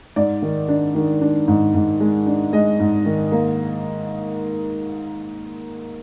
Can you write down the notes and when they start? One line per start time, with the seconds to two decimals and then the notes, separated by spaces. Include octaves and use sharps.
0.16 G#2 D5
0.42 D#3
0.68 D4
0.95 D#3
1.21 D4
1.48 G#2
1.74 G#2
2.00 G#3
2.26 D4
2.53 G#3 D#5
2.80 G#2
3.06 D#3
3.32 A#3